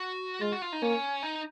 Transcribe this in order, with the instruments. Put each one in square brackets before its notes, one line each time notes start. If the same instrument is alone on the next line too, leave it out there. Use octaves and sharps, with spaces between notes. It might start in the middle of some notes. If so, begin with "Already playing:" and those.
Already playing: [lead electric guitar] F#4
[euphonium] G#3 [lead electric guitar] F4
[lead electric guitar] F#4
F4
D#4
[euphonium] A#3 [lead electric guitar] C#4
[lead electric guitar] D#4